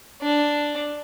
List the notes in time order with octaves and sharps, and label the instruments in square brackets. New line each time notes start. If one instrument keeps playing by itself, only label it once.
[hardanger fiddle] D4